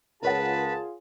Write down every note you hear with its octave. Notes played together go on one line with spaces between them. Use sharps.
C#2 F4 G#4 A#4 B4 C#5 F#5 A5